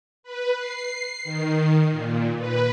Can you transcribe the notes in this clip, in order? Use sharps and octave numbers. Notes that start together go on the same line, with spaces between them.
B4
C7
D#3
A#2
B4